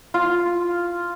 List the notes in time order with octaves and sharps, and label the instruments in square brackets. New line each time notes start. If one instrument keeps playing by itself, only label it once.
[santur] F4